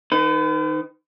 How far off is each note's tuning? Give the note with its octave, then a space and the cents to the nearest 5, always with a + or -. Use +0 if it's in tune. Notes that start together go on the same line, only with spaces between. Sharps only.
D#3 +0 B4 +45